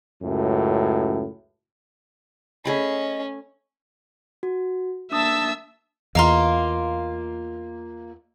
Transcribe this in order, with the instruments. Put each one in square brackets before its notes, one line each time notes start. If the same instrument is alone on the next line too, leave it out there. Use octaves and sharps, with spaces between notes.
[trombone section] C#2 F#2 A2 F#3
[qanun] A3 G#4 B5 [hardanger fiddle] C#4 [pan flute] D#5
[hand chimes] F#4
[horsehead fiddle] A#3 A5 [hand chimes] D4 D#6 [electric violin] E5 E6
[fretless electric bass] E2 [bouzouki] A#3 F4 [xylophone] D#5 A#5 C6